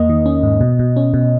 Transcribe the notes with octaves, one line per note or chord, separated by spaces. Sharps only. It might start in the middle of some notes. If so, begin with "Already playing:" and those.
Already playing: E2 A#3 D#5
D#3
C#4
G#2
B2
B2
C#4
B2